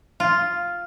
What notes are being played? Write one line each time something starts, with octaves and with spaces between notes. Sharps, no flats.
F4